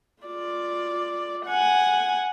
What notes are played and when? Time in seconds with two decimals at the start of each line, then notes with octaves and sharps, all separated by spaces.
0.23 F4 D5
1.46 F#5 G#5